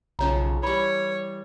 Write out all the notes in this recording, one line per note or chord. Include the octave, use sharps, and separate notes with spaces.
B1 C#3 F3 C#4 C#5 A#5
E3 G3 C#5 B5